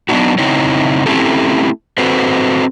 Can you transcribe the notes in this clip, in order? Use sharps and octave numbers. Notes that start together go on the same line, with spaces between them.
F#3 B3 C4 D4 D#4 F#4
C#3 C4 D#4 E4 C#5
A3 C4 C#4 E4 G4 A4
C4 F#4 A4 B4 C5